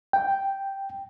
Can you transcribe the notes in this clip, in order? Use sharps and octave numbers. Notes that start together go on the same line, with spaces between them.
G5